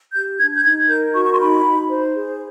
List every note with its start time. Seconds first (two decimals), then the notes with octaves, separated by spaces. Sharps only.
0.13 G4 G6
0.39 D4 G#6
0.55 G6
0.63 D#4 G#6
0.88 A#4 G6
1.13 F#4 C#6
1.23 C#6
1.31 C6
1.38 D#4 B5
1.63 D#4
1.88 C5
2.14 G#4